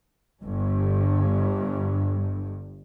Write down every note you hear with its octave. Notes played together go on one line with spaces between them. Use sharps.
G1 G2